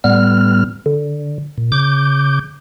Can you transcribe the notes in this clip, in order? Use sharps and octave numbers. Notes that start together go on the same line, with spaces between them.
A2 G3 B3 F6
D3
A#2
C#3 D6 G6